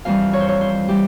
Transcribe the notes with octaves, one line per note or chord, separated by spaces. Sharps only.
F2 E3 G3 F5
C#5
C5
C#5
C5
E3 G3 G4